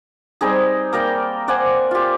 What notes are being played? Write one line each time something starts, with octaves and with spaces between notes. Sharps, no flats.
G3 C4 D#4 G#4
A#3 A#4 D5 G5
C5 D5 F#5 G#5
F4 G4